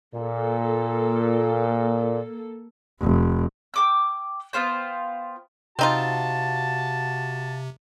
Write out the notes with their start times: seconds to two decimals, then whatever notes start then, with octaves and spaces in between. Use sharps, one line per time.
0.14 A#2 A#3 A4
3.01 F1
3.74 G5 D6 E6
4.53 B3 F4 C5 G5
5.79 C3 C4 D#4 F4 F#4 A5